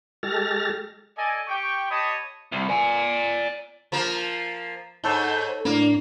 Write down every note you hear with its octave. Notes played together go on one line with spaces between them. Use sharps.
G#3 G4 A4 F6 A6 A#6
A4 D5 D#5 G#5
G4 G5 C#6
G4 C#5 D#5 A5 B5 D#6
C2
D5 G#5
F3 A#3 A#4
G#2 D#4 A4 C#5 G6
A2 A#3 D4